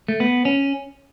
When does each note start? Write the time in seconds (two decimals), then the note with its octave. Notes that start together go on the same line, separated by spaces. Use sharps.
0.08 A3
0.20 B3
0.45 C#4